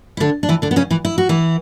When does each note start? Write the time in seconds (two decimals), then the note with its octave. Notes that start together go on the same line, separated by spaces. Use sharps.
0.17 E4
0.20 D3 D4
0.43 D4
0.49 E3 E4
0.62 D3 D4
0.71 B3
0.76 C#3 C#4
0.91 E3 E4
1.05 E4
1.18 F#4
1.29 E3 E4